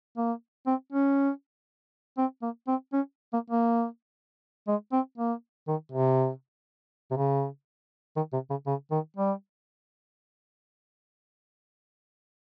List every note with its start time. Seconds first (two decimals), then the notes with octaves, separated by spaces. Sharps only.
0.17 A#3
0.67 C4
0.93 C#4
2.18 C4
2.42 A#3
2.68 C4
2.93 C#4
3.33 A#3
3.50 A#3
4.68 G#3
4.92 C4
5.18 A#3
5.68 D#3
5.92 C3
7.11 C3
7.16 C#3
8.17 D#3
8.33 C3
8.50 C#3
8.67 C#3
8.91 D#3
9.17 G3